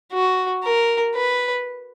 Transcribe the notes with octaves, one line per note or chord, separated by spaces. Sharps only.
F#4
A#4
B4